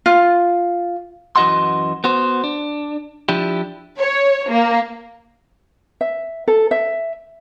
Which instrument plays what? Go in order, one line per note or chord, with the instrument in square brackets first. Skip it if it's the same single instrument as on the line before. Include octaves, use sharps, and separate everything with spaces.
[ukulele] F4
[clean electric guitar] F#2 E3 F#4 D#5 F#5 C6
B3 F#4 C5
D4
F3 D4 E4 G4
[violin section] C#5
A#3
[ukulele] E5
A4
E5